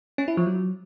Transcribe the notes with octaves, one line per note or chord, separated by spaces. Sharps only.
C#4
E4
F3
F#3